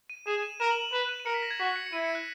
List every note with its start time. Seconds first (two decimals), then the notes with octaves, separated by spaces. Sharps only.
0.10 D#7
0.26 G#4 E7
0.42 D#7
0.60 A#4 E7
0.70 F#7
0.82 F#7
0.93 B4 E7
1.09 D#7
1.20 D#7
1.26 A#4 C#7
1.34 B6
1.43 A#6
1.51 G#6
1.60 F#4 B6
1.76 C#7
1.86 C#7
1.93 E4 D#7
2.04 C#7
2.15 F#6